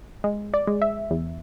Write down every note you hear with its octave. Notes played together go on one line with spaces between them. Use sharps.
G#3
D5
G#3
E5
E2